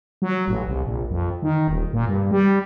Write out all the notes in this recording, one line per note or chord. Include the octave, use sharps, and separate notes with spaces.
F#3
A1
C2
A#1
F2
D#3
D#1
A#2
G2
G3